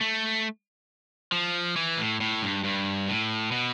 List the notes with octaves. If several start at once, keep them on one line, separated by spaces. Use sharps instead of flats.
A3
F3
E3
A2
A2
G2
G2
A2
B2